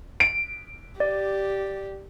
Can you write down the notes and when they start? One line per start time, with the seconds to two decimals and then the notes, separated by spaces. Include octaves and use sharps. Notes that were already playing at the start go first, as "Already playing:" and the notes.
0.20 D7
1.00 G4 D5